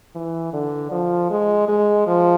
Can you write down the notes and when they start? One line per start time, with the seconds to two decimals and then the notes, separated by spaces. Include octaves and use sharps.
0.15 E3
0.53 D3
0.92 F3
1.30 G#3
1.68 G#3
2.07 F3